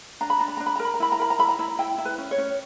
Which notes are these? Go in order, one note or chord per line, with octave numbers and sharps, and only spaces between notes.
D4 A#5
B5
D4 A#5
B5
D4 A#5
B5
A#5
A#4
B5
A#5
E4 B5
A#5
A#4 B5
A#5
E4 B5
A#5
E4
E4 G5
E4
B4
C#4
C#5
C#4